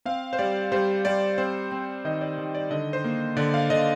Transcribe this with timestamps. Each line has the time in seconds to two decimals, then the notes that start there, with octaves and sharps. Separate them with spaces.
0.05 C4 F5
0.33 C5
0.39 G3 D5
0.72 G3 C5
1.05 G3 D5
1.38 C4 C5
1.72 C4
2.05 D#3 D#5
2.21 D5
2.38 D#3
2.55 D5
2.70 D3 D#5
2.93 C5
3.04 A#3
3.37 D3 D5
3.54 F5
3.70 D3 D#5